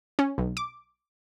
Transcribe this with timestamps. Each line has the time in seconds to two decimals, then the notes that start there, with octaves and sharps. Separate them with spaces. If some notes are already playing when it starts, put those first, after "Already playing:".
0.19 C#4
0.38 B1
0.57 D6